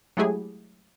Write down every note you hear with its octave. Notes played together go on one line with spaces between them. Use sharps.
F#3 G#3 A3 E4 G4 G#4